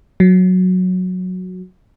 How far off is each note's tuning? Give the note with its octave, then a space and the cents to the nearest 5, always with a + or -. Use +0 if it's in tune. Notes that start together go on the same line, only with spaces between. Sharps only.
F#3 -10